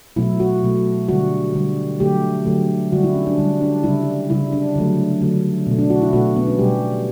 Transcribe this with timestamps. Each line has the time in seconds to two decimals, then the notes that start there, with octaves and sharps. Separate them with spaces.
0.16 B2 F#3 A3 E4
0.40 F#4
0.63 B2 F#3 A3
1.09 D3 G3 F#4
1.54 D3 G3
2.00 D3 F#3 A3 G4
2.46 D3 F#3 A3
2.92 D3 G3 F#4
3.03 E4
3.15 C#4
3.26 D4
3.38 D3 G3
3.61 D4
3.83 C#3 G3 E4
4.30 C#3 G3 E4
4.52 D4
4.75 D3 F#3 A3
5.21 D3 F#3 A3
5.67 B2 A3
5.78 D4
5.90 F#4
6.02 E4
6.13 B2 A3 F#4
6.36 B3
6.48 C#4
6.59 B2 G3 G4